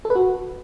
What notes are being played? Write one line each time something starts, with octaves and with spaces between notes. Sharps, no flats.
A4
B4
F#4